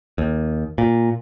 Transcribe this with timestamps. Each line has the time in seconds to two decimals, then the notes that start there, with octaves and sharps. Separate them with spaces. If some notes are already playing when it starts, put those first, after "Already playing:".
0.18 D#2
0.78 A#2